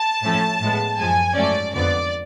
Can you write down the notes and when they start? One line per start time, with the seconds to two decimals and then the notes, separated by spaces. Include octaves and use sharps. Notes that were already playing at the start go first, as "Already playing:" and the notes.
Already playing: A5
0.23 A2 F3 A3 C#4
0.61 A2 G#3 B3
0.98 F#2 F3 G#3 G#5
1.35 G#2 F#3 A3 C#4 D5
1.73 F2 D3 F3 B3 D5